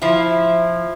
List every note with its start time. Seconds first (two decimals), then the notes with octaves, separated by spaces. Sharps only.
0.02 F3 E4